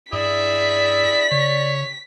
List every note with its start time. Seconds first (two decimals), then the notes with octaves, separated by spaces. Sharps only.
0.13 G2 E4 G#4 D5 E5 B6
1.31 C#3 C#5